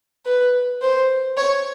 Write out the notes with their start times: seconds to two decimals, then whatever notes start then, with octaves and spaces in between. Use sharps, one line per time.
0.26 B4
0.82 C5
1.38 C#5